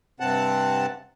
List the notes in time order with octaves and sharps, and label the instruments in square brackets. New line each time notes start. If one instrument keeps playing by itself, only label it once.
[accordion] G2 C3 C4 F#5 A5